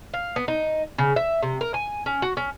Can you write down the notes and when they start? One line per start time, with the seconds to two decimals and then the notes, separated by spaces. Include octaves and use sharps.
0.14 F5
0.36 B3
0.48 D#4
0.98 C#3
1.16 E5
1.42 C3
1.61 A#4
1.74 G#5
2.06 C#4
2.22 F#4
2.37 C#4